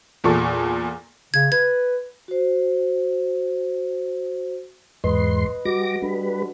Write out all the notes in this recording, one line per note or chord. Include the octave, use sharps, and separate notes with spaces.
E2 A#2 A4 C#6
C#3 G#6
B4 G#6
F#4 C5
E2 G#2 B4 D#5 C6
G3 F#4 D#5 D6 A#6
G3 D4 A4 B4